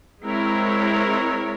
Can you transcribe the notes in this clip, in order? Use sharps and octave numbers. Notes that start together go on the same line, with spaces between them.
G#3 C4 E4 A#4 C#5